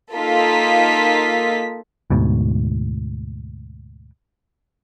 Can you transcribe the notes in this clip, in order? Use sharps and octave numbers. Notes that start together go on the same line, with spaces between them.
A#3 D#4 F4 A4 B6
D2 G#2 B2